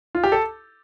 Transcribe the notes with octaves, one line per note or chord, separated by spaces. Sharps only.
F4
G4
A4